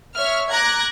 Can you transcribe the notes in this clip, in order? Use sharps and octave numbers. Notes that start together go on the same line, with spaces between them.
C#5 E5 F6
A#5 D6 F#6 G#6 A#6